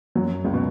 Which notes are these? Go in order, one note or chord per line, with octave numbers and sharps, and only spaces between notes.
F#2 F#3
C#2 C#3
B2